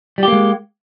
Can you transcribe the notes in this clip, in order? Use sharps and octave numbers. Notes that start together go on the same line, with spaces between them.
G3 G#3 A#3 G4